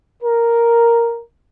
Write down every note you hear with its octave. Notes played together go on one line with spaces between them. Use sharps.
A#4